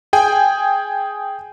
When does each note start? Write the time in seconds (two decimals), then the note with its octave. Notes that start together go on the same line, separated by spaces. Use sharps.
0.13 G#4 G5 G#5